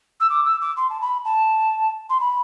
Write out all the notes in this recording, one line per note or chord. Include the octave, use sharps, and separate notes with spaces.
E6
D6
E6
D6
C6
A5
B5
A5
C6
B5